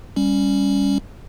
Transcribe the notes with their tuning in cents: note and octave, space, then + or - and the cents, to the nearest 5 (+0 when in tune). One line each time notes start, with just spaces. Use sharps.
G3 +15 C#4 +0